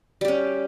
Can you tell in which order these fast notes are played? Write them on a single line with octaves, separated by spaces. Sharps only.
G3 G4 C#4